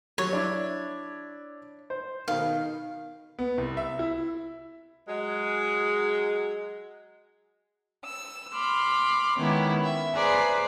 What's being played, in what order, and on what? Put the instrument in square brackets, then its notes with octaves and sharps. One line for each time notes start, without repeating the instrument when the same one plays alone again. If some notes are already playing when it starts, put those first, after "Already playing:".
[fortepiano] F#3 G3 [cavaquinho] C#5
[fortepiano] D4 E4
C5
[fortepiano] B2 D#3 [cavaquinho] F5
[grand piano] B3
C2
E5
E4
[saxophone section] F#3 G#3
[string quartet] E6
B5 C6 D6 F6
D#3 G#3 B3 C#4 E4 G4
E5
G#4 B4 C5 D5 G#5 A#5